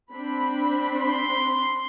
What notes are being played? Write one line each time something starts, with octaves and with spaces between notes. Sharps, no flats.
C4 D4 B5
C6